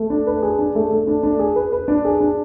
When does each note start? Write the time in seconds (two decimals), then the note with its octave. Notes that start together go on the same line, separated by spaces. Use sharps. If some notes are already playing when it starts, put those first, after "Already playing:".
Already playing: A3
0.10 D4
0.27 B4
0.42 G#4
0.59 D4
0.75 A3
0.91 A3
1.07 D4
1.23 D4
1.39 G#4
1.56 B4
1.72 B4
1.88 D4
2.05 G#4
2.20 D4